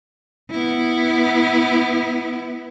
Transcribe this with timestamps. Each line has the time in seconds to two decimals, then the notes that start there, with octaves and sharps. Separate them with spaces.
0.51 B3 E4